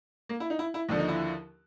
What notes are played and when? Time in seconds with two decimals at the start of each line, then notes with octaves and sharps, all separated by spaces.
0.29 A#3
0.40 E4
0.50 D#4
0.59 E4
0.74 E4
0.89 D#2 D3 F3 D4
0.99 D#4
1.08 E4